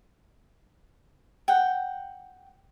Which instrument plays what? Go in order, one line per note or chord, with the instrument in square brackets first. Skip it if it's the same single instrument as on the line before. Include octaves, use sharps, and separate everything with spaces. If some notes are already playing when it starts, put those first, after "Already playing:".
[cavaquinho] F#5 G5